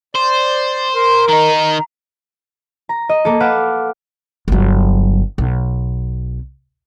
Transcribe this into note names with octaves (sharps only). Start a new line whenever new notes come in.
C5 D5
A#4 C6
D#3 D#4 A#5
A#5
D#5
A#3 A4
B4 F5 F#5 D6 E7
G1 F#3
B1